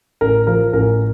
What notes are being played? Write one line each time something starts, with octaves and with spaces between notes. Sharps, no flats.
A1 A#4
F3 A#4
A1 A#4